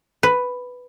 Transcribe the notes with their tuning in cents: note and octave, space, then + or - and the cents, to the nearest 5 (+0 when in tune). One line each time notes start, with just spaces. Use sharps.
B4 +5